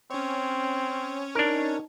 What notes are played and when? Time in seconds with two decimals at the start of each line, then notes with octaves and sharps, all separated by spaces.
0.11 C4 C#4 C#5
1.35 D4 D#4 A#4